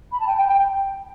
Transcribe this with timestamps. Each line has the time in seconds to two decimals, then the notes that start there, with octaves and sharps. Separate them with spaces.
0.11 B5
0.19 A5
0.27 G5
0.37 G5
0.48 G5